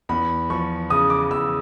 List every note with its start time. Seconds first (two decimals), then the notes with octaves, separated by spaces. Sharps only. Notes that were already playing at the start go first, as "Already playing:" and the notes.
0.09 E2 B5
0.50 F3 C#6
0.90 C#3 D#6
1.10 D6
1.30 E2 E6